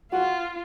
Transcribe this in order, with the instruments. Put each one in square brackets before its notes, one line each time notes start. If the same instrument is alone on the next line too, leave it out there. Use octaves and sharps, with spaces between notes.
[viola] F4 [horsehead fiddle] F#4